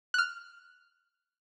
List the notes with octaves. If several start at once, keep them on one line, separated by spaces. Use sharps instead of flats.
F6 F#6